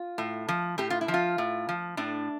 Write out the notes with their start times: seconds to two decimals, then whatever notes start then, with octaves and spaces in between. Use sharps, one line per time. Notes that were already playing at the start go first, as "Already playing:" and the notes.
Already playing: F4
0.18 A2
0.49 F3
0.78 A2 G4
0.90 F4
1.01 E4
1.08 F3
1.14 F4
1.38 A2
1.69 F3
1.97 A2 D4